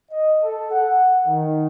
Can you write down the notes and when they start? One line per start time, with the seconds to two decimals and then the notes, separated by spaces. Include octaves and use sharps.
0.11 D#5
0.42 A4
0.71 F#5
1.26 D#3